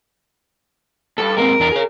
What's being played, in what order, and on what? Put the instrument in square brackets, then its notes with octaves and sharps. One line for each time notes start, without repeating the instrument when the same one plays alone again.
[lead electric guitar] D2 G2 [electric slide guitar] A4
[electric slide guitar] G#3 A#3 C4 [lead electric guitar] A#4
[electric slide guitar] E2 D4 A#5
G#4 C#5